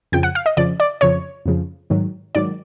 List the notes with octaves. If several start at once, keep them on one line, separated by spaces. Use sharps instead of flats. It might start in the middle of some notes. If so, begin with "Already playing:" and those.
F2 C#3 F3 G5
F#5
F5
D#5
F2 C#3 F3 D5
D5
F2 C#3 F3 C#5
F2 C#3 F3
G#2 D#3 F#3
G#2 D#3 F#3 D5